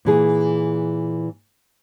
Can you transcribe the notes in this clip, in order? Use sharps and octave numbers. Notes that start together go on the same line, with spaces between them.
A#2 E3 G#4